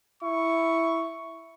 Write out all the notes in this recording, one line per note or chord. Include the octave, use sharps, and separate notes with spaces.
E4 C#6